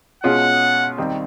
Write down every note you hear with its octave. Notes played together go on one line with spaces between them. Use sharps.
B2 G#3 C#4 F4 G#4 F#5
D#2 D#3 G3 C4 D#4